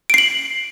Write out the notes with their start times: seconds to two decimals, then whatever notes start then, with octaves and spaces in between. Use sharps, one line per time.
0.10 D7
0.14 C7
0.18 F#7